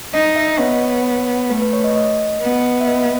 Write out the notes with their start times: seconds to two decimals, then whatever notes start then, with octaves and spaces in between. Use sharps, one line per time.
0.14 D#4 D#5
0.25 D#5
0.36 E5
0.47 D#5
0.59 B3 C#5
1.50 A3 B4
1.62 B4
1.73 C#5
1.84 D#5
1.96 D#5
2.41 B3
2.81 E5
2.87 D#5